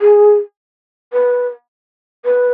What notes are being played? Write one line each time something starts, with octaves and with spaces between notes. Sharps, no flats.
G#4
B4
B4